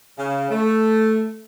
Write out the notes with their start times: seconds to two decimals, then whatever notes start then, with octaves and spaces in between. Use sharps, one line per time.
0.18 C#3
0.50 A3